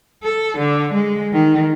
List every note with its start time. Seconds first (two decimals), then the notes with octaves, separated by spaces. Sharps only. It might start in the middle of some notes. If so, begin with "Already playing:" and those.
0.23 A4
0.58 D3
0.94 G#3
1.33 D#3